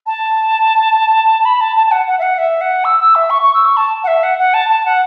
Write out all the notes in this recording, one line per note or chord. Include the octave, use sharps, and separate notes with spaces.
A5
B5
A5
A5
A5
F#5
F#5
E5
F#5
E5
F#5
E6
E6
E5
C#6
C#6
E6
C#6
A5
F#5
E5
F#5
F#5
A5
A5
F#5